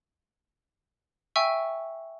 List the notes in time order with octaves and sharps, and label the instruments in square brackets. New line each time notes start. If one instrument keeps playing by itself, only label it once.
[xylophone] E5 G5 G#5 C#6 E6